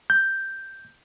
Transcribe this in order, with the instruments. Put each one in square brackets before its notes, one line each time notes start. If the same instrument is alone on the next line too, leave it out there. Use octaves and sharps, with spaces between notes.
[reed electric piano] G6